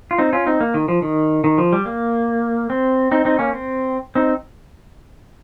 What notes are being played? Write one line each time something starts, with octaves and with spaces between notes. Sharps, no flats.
F4
C4 D#4
C#4 F4
C4 D#4
A#3
D#3
F3
D#3
D#3
F3
G3
A#3
C4
C4 D#4
C4 D#4
A#3 C#4
C4
C4 D#4